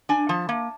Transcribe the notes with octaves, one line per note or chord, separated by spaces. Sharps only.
D4 G#5
F3 A5
A#3